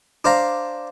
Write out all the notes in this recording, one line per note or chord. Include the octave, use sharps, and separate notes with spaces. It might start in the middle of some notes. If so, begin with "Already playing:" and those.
D4 C5 F5 A#5